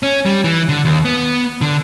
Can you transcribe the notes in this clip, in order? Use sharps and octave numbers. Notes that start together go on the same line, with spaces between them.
C#4
G3
E3
D3
D#2
B3
D3